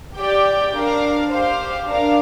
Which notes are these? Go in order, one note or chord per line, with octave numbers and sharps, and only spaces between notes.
G4 D5 G5
D4 A#4 F5
G4 C5 F5
D4 A#4 F5